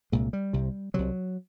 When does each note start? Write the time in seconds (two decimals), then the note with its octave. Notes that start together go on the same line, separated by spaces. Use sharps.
0.12 C2 A#2 G#3
0.33 G3
0.53 C2 C3
0.94 C2 C3 F#3